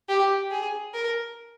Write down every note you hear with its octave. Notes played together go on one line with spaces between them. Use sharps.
G4
G#4
A#4